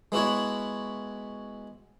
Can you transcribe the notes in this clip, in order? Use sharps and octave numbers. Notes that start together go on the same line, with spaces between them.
G#3 B3 E4 F#4 C#5